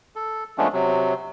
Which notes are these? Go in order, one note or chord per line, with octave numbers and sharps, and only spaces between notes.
A4
F3 G#3 A3 B3 C#4 D4
C3 F#3